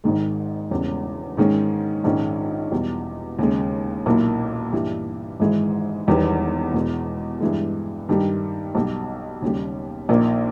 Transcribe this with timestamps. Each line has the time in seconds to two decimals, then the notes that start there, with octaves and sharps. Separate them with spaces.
0.04 G#1 G#2 D#3 G#3
0.71 E1 E2 C#3 G3
1.37 G#2 D#3 G#3 C#4
2.04 A#1 G#2 D#3 G#3 C#4
2.72 E2 B2 G3
3.39 D#2 C#3 G#3
4.06 B1 A#2 A#3 E4
4.73 G2 E3 G3
5.40 G#1 G#2 E3 G#3
6.07 E1 E2 D#3 G3 B3
6.74 E2 B2 G#3
7.40 G2 E3 G#3
8.09 G2 D#3 G3
8.75 B1 B2 G3
9.42 D#2 C#3 G3
10.09 A#1 A#2 A#3 D#4